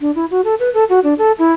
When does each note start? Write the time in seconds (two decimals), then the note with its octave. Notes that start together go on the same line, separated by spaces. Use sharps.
0.01 D4
0.15 E4
0.31 F#4
0.45 A4
0.60 B4
0.74 A4
0.89 F#4
1.04 D4
1.18 A4
1.39 E4